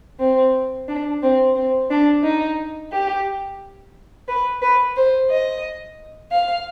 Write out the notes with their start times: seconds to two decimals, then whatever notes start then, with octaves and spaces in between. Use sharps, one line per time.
0.20 C4
0.88 D4
1.22 C4
1.56 C4
1.90 D4
2.23 D#4
2.92 G4
4.29 B4
4.62 B4
4.96 C5
5.30 D#5
6.32 F5